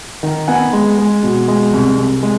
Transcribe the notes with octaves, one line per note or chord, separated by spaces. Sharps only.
D#3
B3 F#5 G#5
G#3
G#3
B2
G#3
C2
C2
G#3